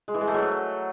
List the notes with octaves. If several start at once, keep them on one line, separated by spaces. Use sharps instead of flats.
G#3
E3
G#3
A3
F#3